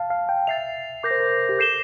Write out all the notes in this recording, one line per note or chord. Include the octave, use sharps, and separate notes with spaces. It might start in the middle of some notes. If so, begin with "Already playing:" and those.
Already playing: F5 A5
F5
G5
E5 A6 C7 F7
A#4 D6 G6 A#6
C5
A#4
G4
A4 G6 C7 E7 G7